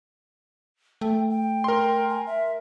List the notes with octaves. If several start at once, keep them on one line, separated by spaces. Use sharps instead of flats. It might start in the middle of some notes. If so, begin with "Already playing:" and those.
A3 G5
G5
A#4 C6
G#5
E5